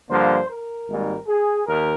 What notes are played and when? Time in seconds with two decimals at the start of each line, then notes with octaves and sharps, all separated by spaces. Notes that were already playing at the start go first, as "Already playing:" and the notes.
0.10 G2 D3 F3 A#3 C5
0.50 A#4
0.88 G#1 G#2 G3 A#3
1.27 G#4
1.66 D#2 A#4